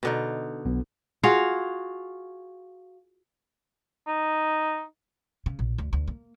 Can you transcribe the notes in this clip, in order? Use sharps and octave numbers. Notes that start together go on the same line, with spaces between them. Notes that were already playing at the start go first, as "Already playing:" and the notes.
B2 D3 D#4
B1 B3
F4 F#4 G#4 F5
D#4
C#3
A#1
D2
D2
A#3